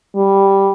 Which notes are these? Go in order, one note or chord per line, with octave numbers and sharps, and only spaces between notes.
G3